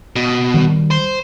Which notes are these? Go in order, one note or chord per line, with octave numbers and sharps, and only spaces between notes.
B2
D#3 G3
C5